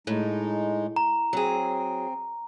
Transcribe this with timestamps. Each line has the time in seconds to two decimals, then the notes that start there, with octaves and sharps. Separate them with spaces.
0.07 A2 G#3 D#4
0.96 A#5
1.33 F#3 C4 G#4